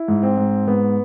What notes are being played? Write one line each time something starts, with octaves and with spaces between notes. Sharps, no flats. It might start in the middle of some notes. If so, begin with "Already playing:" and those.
Already playing: E4
G#2
C4
G#2
G#2 B3